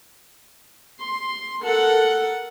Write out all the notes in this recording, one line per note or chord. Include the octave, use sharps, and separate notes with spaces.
C6
A4 A#4 F#5